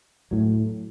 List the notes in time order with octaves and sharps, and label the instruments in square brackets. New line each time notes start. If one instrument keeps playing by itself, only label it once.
[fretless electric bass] A2 F#3